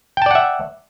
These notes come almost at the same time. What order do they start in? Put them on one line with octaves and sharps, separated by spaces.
G5 A5 D5 F#5 E5